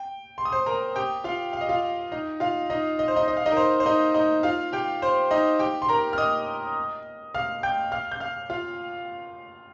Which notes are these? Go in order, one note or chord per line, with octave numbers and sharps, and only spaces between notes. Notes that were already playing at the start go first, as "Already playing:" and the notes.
Already playing: G5
C6
D#6
C5 C6
A#4 A#5
G4 G5
F4 F5
F5
D#5
F4 F5
D#4 D#5
F4 F5
D#4 D#5
D#5
C5
D#4 D#5
D#5
F5
D#4 D#5
A#4
C5
C5
D#4 D#5
D#4 D#5
F4 F5
G4 G5
C5
D#4 D#5
G4 G5
C6
A#4 A#5
F6
D#5 D#6
F5 F6
G5 G6
F5 F6
G6
F5 F6
F4 F5